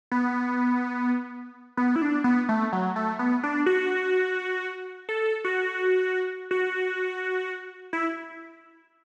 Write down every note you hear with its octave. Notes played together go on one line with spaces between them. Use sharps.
B3
B3
E4
D4
B3
A3
F#3
A3
B3
D4
F#4
A4
F#4
F#4
E4